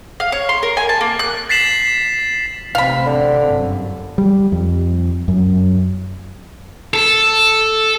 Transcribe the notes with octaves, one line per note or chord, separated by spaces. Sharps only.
F5
C#5
C6
A#4
G#5
A5
A#3
F#6
A6 B6 C7 E7 F#7
A1 C3 C4 F5 B5
D3
G1 F#2
G3
F2
F#2
A4